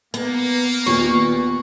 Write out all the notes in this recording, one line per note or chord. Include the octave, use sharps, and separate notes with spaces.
A#3 B3
D#2 A#2 B3 C#6